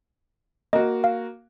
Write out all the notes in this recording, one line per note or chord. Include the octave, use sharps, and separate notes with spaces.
A#3 F#4 D#5
F5